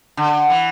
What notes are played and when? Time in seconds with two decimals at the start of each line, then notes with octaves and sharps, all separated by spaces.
0.17 D3
0.50 E3